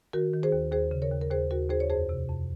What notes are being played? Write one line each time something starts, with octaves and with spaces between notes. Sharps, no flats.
D#3 F#4 A#4
D#3
G#4 C5
D#2
D#2 G#4 C5
C#3
A#4 C#5
D#2
A#4
D#2 G#4 C5
D#2 F#4 A#4
D#2 G#4 C5
C#5
F2 G#4 C5
C3
F2